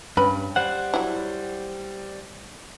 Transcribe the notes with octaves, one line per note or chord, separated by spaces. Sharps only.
G2 C#4 B4 B5
G3 C5 F#5
F#3 E4